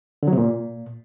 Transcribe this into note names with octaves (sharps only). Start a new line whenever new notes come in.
D3
F#3
C3
A#2